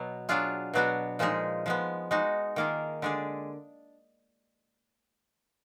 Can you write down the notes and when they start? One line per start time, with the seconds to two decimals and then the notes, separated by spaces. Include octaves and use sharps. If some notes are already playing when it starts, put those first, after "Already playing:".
Already playing: B2 F#3 B3
0.29 F#3 D4 F4 G#4
0.74 B2 F#3 B3 D4 F#4
1.19 A#2 F3 G#3 D#4 G#4
1.66 F3 G#3 B3
2.11 G#3 D#4 F#4
2.56 D#3 A#3 F4 G#4
3.02 D3 G#3 D4 G#4